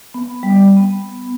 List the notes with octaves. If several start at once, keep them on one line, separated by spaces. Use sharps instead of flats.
B3
G3
B3